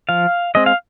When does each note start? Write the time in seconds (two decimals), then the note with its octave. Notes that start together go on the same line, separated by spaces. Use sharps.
0.09 F3 F5
0.55 G#3 C4 D#5
0.66 F5